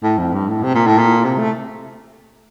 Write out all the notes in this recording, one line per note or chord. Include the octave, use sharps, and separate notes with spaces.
A2
F2
G2
A2
C3
A#2
A2
A#2
C3
A3